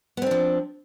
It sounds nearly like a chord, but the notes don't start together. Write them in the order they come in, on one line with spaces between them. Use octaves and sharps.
B3 C4 D4 F3